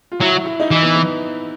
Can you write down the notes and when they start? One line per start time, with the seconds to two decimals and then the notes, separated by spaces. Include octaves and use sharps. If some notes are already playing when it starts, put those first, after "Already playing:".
0.12 F4
0.20 F#3 E4
0.46 E4
0.60 D#4
0.71 E3 E4
0.82 B3
0.95 B3